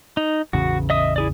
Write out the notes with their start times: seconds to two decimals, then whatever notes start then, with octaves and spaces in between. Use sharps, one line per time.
0.17 D#4
0.53 A1 E2 C#3 F#4
0.90 D#5 E5 D#6
1.16 E4 G#4 D5